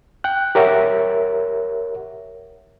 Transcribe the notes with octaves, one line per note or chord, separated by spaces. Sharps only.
G5 F#6
G4 A#4 C#5 E5 F#5